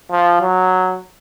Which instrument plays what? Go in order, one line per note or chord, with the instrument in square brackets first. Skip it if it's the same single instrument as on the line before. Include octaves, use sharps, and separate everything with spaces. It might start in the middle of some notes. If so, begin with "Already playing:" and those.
[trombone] F3
F#3